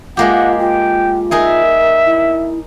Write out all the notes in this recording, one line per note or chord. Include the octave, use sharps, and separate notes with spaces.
G#3 A#3 F4 G4 F#5
F4 G5
D#4 G#4 A#4 E5
E4